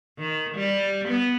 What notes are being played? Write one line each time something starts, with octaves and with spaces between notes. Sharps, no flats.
D#3
G3
B3